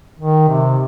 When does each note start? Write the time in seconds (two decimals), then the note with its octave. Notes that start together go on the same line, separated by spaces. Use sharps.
0.20 D#3
0.49 C3